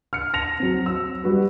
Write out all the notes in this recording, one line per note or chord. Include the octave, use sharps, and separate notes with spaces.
F6 C#7
A5 A#6 F7
F#3 C4
E6
G3 F#4 B4